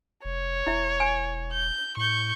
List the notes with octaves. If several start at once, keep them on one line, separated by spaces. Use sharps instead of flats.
F1 C#5
E1 E4 E5
G#5
G6
A2 C#6 G6